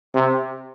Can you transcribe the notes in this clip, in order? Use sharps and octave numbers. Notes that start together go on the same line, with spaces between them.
C3